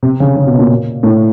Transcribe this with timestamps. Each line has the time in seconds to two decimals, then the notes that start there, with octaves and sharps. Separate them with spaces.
0.03 C3
0.20 C#3
0.36 C#3
0.47 B2
0.59 A#2
1.03 A2